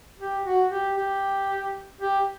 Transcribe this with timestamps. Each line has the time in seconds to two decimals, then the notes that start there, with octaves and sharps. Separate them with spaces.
0.19 G4
0.45 F#4
0.71 G4
0.97 G4
2.01 G4